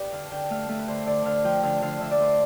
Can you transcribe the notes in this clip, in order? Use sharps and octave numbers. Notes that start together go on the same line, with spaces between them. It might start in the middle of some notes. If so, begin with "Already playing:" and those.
Already playing: G4 B4 D5
D3 F5
D3 G5
A3 F5
A3 E5
B4
D3 C5
D3 D5
D3 F5
F3 G5
D3 F5
D3 F5
D3 E5
D5
A3 C5